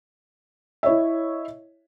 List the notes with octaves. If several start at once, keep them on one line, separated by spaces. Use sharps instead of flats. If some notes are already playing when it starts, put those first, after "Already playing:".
E4 C#5 D#5 E5